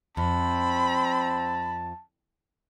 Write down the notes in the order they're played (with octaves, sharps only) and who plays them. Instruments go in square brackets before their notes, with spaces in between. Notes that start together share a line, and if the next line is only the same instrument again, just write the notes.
[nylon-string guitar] F2 [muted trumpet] C4 [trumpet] A5 [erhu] B5